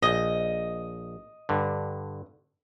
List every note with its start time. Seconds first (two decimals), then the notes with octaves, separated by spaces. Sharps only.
0.02 A#1 D#5
1.49 G2 D3